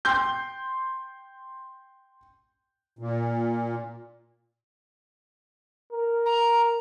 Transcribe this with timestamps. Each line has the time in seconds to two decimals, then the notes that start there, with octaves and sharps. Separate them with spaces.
0.05 G5 C6 G6
2.99 A#2
5.93 A#4
6.26 A#5